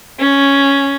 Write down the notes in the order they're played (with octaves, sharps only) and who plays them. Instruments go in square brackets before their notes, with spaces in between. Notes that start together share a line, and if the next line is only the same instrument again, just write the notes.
[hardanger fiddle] C#4